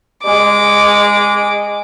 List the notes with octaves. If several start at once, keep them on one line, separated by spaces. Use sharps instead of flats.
G#3 D6